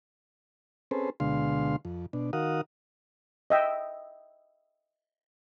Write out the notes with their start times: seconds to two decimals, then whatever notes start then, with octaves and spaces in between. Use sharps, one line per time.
0.91 C4 C#4 G#4 A4 B4 C5
1.20 D2 B2 D3 G#3 F5 C6
1.85 F2
2.13 B2 D4
2.33 D#3 F#4 A#4 F5 F#5 D#6
3.50 D#5 E5 G5